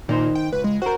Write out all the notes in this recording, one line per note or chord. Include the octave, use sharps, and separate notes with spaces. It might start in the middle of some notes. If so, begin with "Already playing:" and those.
A#2 D#3 D#4 C5
G5
C#2 B4
G#3
F#4 A#4 C5